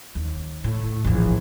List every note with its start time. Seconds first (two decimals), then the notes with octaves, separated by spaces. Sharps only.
0.15 D#2
0.64 A2
1.04 A#1 E2